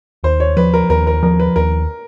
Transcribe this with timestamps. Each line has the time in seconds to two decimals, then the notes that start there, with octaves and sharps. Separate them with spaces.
0.24 D#2 C5
0.40 C#5
0.57 F3 B4
0.74 A#4
0.89 D#2 A#4
1.07 A#4
1.23 F3 A#4
1.40 B4
1.56 D#2 A#4